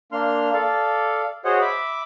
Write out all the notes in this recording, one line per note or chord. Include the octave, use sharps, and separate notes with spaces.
A#3 D4 C6 F6
A4 D5 F5
F#4 G#4 C5 C#5 D#5 F#5
E5 B5 D6